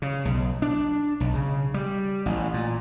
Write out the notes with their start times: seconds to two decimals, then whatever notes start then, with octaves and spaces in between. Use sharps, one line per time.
0.02 C#3
0.25 B1
0.62 D4
1.20 B1
1.34 C#3
1.74 G3
2.26 A1
2.54 A#2